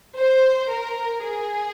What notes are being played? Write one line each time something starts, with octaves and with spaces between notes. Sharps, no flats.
C5
A#4
G#4